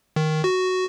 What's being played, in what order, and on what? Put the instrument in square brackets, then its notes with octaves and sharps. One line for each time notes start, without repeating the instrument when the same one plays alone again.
[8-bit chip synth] D#3
F#4